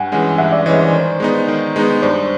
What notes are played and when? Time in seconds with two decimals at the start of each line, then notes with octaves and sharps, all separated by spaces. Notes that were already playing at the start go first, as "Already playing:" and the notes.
Already playing: G2 F#5 G#5
0.12 E3 G#3 C#4
0.38 G2 E5 F#5
0.52 D5 E5
0.66 E3 G#3 C#4 C#5 D#5
0.79 C5 D5
0.93 D#3
1.20 G#3 B3 D#4
1.48 D#3
1.76 G#3 B3 D#4
2.02 G2 C5 D5